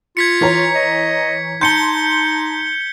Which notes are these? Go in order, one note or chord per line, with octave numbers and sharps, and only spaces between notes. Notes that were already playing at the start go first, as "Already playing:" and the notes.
F4 G#6 B6 C#7
E3 C#5 A#5
D#5
D#4 A5 C6 G6 C#7 G7